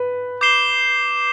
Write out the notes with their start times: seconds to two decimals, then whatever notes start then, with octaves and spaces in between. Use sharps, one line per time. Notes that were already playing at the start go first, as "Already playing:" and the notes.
Already playing: B4
0.41 D6 G6 C7 E7 G7